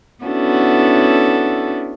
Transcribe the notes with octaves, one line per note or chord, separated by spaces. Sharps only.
B3 C#4 D4 E4 F#4 A4